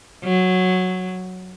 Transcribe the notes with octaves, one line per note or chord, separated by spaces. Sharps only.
F#3